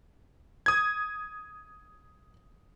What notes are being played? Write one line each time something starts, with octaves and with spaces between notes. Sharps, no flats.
D#6 G#6